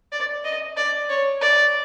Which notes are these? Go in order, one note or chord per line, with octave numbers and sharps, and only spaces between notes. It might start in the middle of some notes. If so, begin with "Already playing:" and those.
D5
D#5
D5
C#5
D5